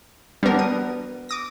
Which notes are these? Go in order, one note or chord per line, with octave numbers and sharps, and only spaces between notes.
G3 B3 D4 A#4
D#6
D6 D#6 A#6